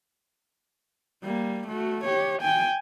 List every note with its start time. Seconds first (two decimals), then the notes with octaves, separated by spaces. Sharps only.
1.23 G3 A#3
1.68 A3 F#4
2.05 G4 C#5
2.42 G5 G#5